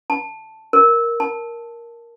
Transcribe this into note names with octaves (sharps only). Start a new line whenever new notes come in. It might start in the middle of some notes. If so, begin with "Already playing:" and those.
A5
A#4
A5